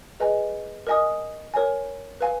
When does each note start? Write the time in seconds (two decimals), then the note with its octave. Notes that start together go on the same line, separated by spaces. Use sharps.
0.20 G#4 B4 D#5 G#5
0.87 A#4 D#5 G#5 D#6
1.54 A#4 C#5 G#5
2.21 B4 F5 G#5